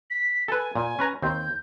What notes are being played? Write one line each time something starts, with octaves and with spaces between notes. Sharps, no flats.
B6
A4 B4 G#5
A#2 G#5
C#4 B4 A#5
D#2 C4 G6